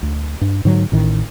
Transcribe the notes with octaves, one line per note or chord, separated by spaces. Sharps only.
D2
G2
G#2 D3 F#3
A1 A2 D#3